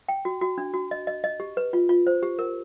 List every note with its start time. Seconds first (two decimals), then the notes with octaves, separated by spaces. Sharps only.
0.09 G5
0.25 F#4
0.41 F#4
0.58 D4
0.74 F#4
0.91 D#5
1.07 D#5
1.24 D#5
1.40 G4
1.57 B4
1.73 F4
1.89 F4
2.07 C5
2.23 G4
2.39 A#4